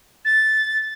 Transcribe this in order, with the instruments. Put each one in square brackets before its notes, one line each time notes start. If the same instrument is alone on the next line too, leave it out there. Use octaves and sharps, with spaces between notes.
[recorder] A6